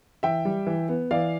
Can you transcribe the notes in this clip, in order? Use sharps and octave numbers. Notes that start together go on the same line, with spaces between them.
E3 E5 G5
G3
E3
B3
E3 D5 F5